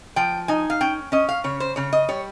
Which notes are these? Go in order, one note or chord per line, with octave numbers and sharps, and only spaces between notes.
F3 G5
D#4 G#5
F5
C#4 G5
C#4 D#5
F5
C#3 C#5
C5
C#3 C#5
D#5
G3 C#5